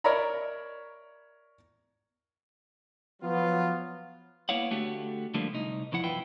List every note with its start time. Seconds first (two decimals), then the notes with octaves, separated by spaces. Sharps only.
0.04 A#4 C#5 D5 E5 A#5 B5
3.22 F3 F#3 B3 F4
4.49 A#3 B3 E4 C#5 F5 F#5
4.71 D3 A3 F#4 G4
5.34 D3 F3 G3 A3 A#3
5.53 C2 D#4
5.92 E2 F3 E4 F#5
6.03 B1 F#2 E4 F4 B4 G5